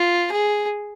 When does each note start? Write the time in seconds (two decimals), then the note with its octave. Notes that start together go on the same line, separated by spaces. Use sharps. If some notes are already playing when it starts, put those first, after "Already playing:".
Already playing: F4
0.32 G#4